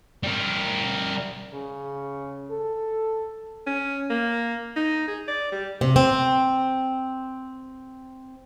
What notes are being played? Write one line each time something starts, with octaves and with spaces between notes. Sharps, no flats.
G3 A#4
C#3
A4
C#4
A#3
D#4
G#4
D5
G3
C3
C4